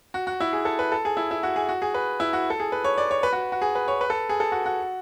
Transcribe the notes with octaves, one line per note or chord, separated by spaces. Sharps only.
F#4
F#4
E4
G#4
A4
B4
A4
G#4
E4
E4
F#4
G#4
F#4
G#4
B4
E4
F#4
A4
G#4
B4
C#5
D5
C#5
B4
F#4
F#4
G#4
B4
C#5
B4
A4
G#4
A4
F#4
F#4